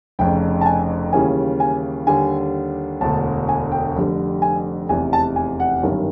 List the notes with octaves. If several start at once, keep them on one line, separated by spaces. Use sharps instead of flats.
F1 F2 C#3 G5
A5
G#5
D#2 C#3 E3 G3 G#5
G#5
D#2 D3 G3 G#5
E1 D2 D3 A5
G#5
G5
F1 F2 D3 G3
G#5
F1 E2 C3 G#5
A5
G#5
F#5
G1 F#2 D#3 G3